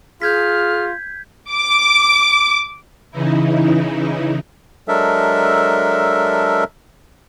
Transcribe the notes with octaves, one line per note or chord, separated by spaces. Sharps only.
F4 G#4 F6 G6 G#6 B6
D6
C#3 E3 D#4 E4
F#3 G#3 D4 A4 A#4 E5